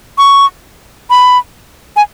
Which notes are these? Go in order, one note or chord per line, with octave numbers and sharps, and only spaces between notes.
C#6
B5
G#5